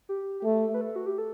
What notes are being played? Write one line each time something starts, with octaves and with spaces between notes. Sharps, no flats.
G4
G4
A3 A4
B4
A4
F#4
G4
A4